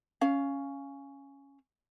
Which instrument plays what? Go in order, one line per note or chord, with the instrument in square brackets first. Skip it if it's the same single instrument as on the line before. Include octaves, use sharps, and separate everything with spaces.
[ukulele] C#4 F5